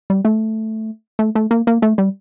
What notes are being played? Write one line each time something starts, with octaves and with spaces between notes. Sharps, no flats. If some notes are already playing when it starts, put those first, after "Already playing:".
G3
A3
A3
A3
A#3
A#3
A3
G3